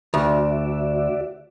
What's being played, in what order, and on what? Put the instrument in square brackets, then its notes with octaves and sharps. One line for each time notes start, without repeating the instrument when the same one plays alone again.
[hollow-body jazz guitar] D2 [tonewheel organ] F#4 D5 E5